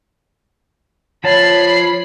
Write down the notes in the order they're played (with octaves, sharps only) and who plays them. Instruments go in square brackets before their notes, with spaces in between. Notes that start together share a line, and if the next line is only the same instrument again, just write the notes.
[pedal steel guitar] F3 A5 [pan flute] C#5 [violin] B5 C7